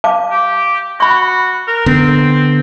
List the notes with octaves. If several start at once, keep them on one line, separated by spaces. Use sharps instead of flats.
F5 A5 D6
G4
F#4 B5 C#6
A#4
D3 B3 C4